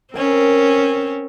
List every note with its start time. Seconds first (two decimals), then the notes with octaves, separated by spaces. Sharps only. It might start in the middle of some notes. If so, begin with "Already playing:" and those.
0.14 C4 C#4 A#4 G#5